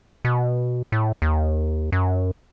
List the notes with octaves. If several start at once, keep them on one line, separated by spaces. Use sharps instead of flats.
B2
A2
D#2
F#2